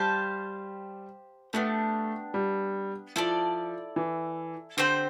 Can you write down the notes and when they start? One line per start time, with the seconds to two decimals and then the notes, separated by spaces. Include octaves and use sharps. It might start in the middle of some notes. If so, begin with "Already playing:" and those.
Already playing: G3 G4 C5 F5 A5
1.53 A3 B3 D4 G4
2.34 G3
3.16 F3 E4 A4 D5
3.96 E3
4.77 D3 C4 G4 C5 G5